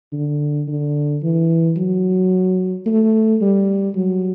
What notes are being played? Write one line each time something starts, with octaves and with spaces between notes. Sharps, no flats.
D3
D3
E3
F#3
A3
G3
F#3